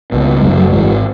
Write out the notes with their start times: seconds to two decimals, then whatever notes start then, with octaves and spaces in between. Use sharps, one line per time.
0.12 C#2 B2
0.42 F#1 F#2 C#3 G#3 B3
0.57 F#3 A3
0.72 G#1 G#2 E3 G#3